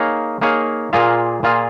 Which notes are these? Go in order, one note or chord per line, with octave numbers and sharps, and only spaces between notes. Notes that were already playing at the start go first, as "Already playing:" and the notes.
Already playing: A#3 D#4 G#4 C#5 F5
A#3 D#4 G#4 C#5 F5
A#2 A#3 F4 G#4 F5
A#2 A#3 F4 G#4 F5